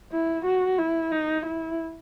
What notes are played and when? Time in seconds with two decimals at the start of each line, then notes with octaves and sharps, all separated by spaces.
0.12 E4
0.46 F#4
0.79 E4
1.12 D#4
1.46 E4